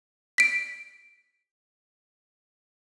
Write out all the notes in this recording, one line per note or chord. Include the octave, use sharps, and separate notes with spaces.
B6 D7